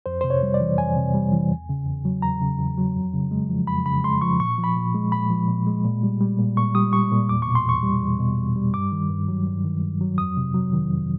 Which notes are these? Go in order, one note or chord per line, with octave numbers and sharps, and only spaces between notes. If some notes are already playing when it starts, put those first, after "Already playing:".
F2 C5
C3 C5
C#5
G3
D5
E3
F2 G#5
C3
G3
E3
E2
C#3
E2
F#3
E2 A#5
C#3
E2
F#3
F2
C#3
G#3
F3
F2 B5
C#3 B5
G#3 C6
F3 C#6
A#2 C#6
F3
B5
A#2
G#3
A#2 B5
F3
A#2
G#3
A#2
G3
G3
A#2
A#2 C#6
G3 D#6
G3 C#6
A#2
E2 D6
B2 C#6
C6
E2 C#6
G3
E2
B2
E2
G3
G2 D6
D#3
G2
F#3
G2
D#3
G2
F#3
F2 D#6
C3
F#3
D#3
F2